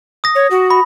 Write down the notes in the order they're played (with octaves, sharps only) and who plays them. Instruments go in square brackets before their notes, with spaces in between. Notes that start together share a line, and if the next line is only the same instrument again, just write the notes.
[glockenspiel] D#6 A#6
[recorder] C#5
F#4
[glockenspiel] B5